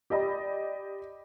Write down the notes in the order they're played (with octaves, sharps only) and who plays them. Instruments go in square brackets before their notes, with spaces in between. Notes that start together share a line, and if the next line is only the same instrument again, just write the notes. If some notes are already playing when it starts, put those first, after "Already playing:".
[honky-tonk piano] G4 D5 D#5 B5